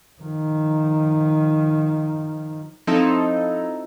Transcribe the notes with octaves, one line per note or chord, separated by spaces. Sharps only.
D#3 F3
F3 C4 D#4 E4 A4